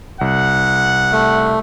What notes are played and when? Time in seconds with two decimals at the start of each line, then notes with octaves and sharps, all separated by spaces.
0.21 C2 F#5
1.12 A3